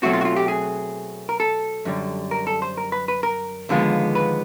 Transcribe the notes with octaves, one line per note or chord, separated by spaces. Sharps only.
B2 F#3 A3 C4 F#4
F4
F#4
F4
G4
G#4
A#4
A4
F#2 D3 G3
A#4
A4
C5
A#4
B4
B4
A#4
D#2 D3 F3 G#3 B3
B4